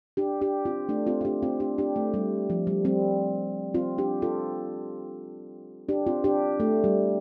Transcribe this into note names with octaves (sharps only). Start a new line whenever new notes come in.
D4 G4
D4 G4
C4 F4
A3 D4
C4 F4
F4
D4 G4
C4 F4
D4 G4
D4 G4
A3
G3
F3
G3
G3 C4
C4 F4
D4 G4
F4 A4
D4 G4
C4 F4
D4 G4
A3
G3